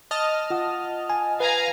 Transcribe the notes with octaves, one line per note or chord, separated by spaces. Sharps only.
D#5 A5 F6
F4 F#5 D#6
G#5
B4 F5 G#5 A#5